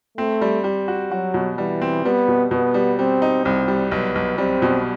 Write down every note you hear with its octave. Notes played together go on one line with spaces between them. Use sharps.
A3 C4
G3
G3
F#4
F#3 F#4
B2
E3 G3
C4
G3 B3
B2
B2 B3
G3
G3 C4
D#4
C2 C4
G3
B1 B3
B1
G3 C4
B2